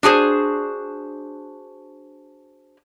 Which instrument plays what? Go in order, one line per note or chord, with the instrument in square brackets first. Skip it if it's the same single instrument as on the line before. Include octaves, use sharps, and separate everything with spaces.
[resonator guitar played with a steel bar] D4 F#4 G#4 C5